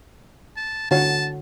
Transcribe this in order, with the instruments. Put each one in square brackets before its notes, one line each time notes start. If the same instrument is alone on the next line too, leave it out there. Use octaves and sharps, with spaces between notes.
[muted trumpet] A5
[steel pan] D3 F#4 C#5 [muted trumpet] A5